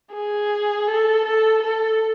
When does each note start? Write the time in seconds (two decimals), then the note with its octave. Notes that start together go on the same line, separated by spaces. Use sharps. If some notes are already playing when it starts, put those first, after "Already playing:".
0.13 G#4
0.88 A4
1.25 A4
1.62 A4